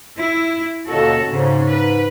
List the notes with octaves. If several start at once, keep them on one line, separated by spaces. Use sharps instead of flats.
E4
D#2 B2 D3 C#4 F#4 A4
G#2 C#3
B4